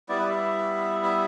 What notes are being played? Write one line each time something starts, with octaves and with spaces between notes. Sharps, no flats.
G3 B3 E4 D5
B4
D5
E5
E5